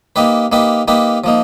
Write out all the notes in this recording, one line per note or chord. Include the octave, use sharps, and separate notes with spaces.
A#3 D#4 G4 B4
A#3 D#4 G4 B4
A#3 D#4 G4 B4
F3 A#3 D#4